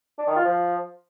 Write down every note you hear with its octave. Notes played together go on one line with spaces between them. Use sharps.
D4
D#3
F4
F3